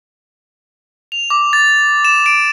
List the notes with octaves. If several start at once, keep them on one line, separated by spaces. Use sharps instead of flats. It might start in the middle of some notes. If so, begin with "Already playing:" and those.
F7
D6
A6
E7
D7